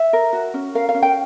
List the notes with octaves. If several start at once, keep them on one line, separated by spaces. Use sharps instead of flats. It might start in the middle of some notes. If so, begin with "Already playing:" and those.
Already playing: E5
A#4
F#4
C#4
A#4 F5
F5
C#4
G5